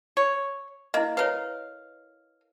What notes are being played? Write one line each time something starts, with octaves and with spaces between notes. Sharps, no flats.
C#5
A#3 E4 D#5
A#4 B4 C#5 F5